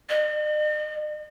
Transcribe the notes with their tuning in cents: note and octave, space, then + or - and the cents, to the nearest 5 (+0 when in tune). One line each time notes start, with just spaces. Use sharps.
D#5 -45